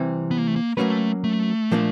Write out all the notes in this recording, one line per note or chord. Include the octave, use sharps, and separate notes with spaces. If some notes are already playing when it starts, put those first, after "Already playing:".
Already playing: C3 E3 G3 C4
B3
A#3
A3
A#3
F#3 A3 A#3 C#4 F#4 B4
A3
A#2 F3 A#3 D4